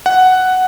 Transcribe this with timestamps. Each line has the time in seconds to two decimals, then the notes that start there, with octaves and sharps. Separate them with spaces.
0.06 F#5